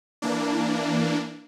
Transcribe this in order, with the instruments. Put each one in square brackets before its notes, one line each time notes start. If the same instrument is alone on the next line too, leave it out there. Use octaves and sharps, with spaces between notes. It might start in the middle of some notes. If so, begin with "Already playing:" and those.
[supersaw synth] E3 A#3 D4